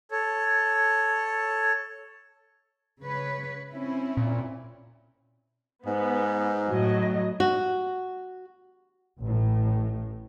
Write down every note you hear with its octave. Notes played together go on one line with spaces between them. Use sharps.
A4 C#5
C#3 B4 C#5
C4 C#4 E4
A#2
G#2 B3
A2 F#3 D#5
F#4
A1 A2